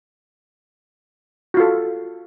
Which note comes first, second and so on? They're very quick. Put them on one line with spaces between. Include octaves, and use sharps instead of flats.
F#4 F4 A4